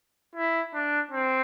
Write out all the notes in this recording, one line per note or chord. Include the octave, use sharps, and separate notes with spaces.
E4
D4
C4